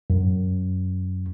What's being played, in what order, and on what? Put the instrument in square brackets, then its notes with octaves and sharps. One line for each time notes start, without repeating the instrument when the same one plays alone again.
[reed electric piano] F#2